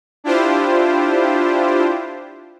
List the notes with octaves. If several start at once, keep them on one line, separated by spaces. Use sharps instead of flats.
D4 E4 F4 G4 C5